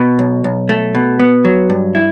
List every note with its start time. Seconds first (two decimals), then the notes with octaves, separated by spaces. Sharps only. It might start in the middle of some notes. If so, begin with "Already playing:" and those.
Already playing: B2
0.19 B1
0.44 B1
0.69 A3
0.95 B2
1.20 B3
1.45 F#3
1.70 G2
1.95 E4